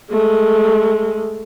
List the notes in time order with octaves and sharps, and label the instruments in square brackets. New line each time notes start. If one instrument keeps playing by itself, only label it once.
[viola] G#3 A3